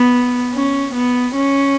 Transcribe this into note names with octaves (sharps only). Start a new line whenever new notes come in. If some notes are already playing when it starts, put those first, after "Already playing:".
Already playing: B3
C#4
B3
C#4